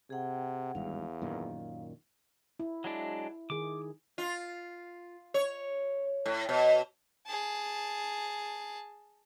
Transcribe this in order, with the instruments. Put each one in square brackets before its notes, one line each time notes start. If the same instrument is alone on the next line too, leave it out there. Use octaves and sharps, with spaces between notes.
[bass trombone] C3 [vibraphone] G#4 F#5 G5
[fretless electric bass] G#1 G2 [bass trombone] E2 [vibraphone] F5
[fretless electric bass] F#2 A#2 D#3
[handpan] E4
[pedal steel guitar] F#3 G#3 D4
[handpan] D#3 G#4 [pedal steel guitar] D6
[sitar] F4
C#5
A2
B2
[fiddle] G#4 A5